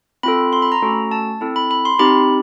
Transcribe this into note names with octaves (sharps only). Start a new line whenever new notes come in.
C4 F4 A4 B5
C6
B5
A#5
A3 C#4 F#4 A4
A5
C4 E4 A4
B5
B5
C6
C4 D#4 G4 B5